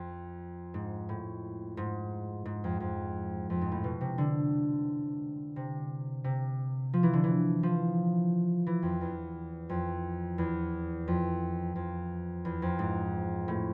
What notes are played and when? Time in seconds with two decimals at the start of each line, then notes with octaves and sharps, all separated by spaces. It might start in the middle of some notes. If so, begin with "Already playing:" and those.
Already playing: F2
0.74 G#2
1.09 A2
1.77 G#2
2.45 G#2
2.64 F2
2.80 F2
3.50 F2
3.61 G#2
3.72 A2
3.84 B2
4.01 C3
4.18 D3
5.56 C3
6.24 C3
6.93 F3
7.03 E3
7.13 D3
7.24 E3
7.63 F3
8.67 E3
8.83 F2
9.01 E2
9.69 F2
10.38 E2
11.08 F2
11.76 F2
12.45 E2
12.62 F2
12.79 G#2
13.48 A2